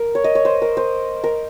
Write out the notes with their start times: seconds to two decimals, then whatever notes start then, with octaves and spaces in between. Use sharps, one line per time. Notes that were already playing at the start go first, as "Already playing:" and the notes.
Already playing: A#4
0.15 C#5
0.24 D#5
0.35 C#5
0.45 C5
0.62 A#4
0.77 C5
1.24 A#4